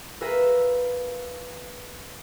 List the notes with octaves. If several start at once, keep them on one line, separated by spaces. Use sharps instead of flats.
F4 A#4 B4 E5 G#5 A#5